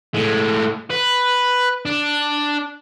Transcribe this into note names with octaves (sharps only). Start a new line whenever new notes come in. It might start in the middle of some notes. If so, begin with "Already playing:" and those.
A2 G#3
B4
D4